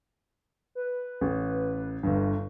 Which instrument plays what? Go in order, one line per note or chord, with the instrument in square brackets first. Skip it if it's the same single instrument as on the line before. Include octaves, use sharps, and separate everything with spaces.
[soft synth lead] B4
[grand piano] A1
G1 G2